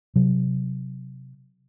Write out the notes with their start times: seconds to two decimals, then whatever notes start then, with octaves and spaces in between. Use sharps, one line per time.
0.16 C3 F#3